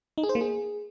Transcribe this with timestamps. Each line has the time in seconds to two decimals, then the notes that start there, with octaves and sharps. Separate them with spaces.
0.18 D#4
0.23 G#4
0.29 C5
0.35 A#3
0.41 G#4